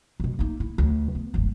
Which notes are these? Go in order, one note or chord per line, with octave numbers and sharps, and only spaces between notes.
F#2 B2
A#3 D#4
E4
D2
B3
D1 G#1